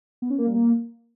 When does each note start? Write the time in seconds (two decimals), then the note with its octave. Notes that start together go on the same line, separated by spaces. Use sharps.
0.22 B3
0.30 C#4
0.38 A#3
0.46 G3
0.55 A#3